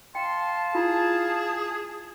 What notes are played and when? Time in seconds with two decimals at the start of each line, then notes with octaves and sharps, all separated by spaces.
0.15 F5 G5 A5 C6
0.75 E4 F4 G#4